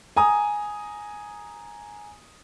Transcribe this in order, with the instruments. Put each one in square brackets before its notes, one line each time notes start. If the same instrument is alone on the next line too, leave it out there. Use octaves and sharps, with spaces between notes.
[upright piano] G#5 A#5 D#6